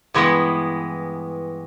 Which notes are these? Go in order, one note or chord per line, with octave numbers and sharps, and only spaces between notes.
G2 E3 G#3 B3